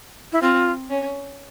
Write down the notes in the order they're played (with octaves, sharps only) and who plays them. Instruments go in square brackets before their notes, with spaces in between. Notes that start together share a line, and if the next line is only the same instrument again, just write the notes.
[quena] E4
[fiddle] C4 [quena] F4
[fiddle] C#4